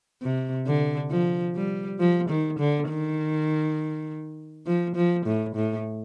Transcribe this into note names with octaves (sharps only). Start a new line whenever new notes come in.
C3
D3
F3
G3
F3
D#3
D3
D#3
F3
F3
A2
A2